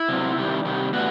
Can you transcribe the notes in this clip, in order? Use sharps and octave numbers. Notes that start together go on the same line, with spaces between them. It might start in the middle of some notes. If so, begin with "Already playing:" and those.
Already playing: E4
C3 F#3 C4
C3 D#3 G3
C3 D#3 G3
A2 E3 G3 B3 F#4